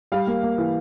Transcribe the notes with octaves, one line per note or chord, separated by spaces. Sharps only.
G3 F5
A#3
A#3
E3